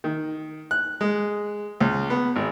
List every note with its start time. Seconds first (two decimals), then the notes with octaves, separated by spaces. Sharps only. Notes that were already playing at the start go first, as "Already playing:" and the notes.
0.04 D#3
0.71 F#6
1.01 G#3
1.81 C#2
2.10 B3
2.36 G#1